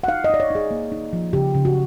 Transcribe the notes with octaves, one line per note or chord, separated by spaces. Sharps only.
F#5
D#4 F5
D#5
D#4 D5
C#5
D#4 G#4
A#3
D#4
F3
C#3 G4
C#3
F#4